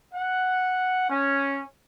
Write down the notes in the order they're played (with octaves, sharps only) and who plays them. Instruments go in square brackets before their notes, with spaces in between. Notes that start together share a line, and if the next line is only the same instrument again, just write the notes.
[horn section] F#5
C#4